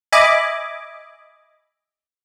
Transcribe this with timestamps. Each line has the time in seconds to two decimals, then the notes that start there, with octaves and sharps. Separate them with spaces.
0.12 D#5 E5 G#5 B5 D6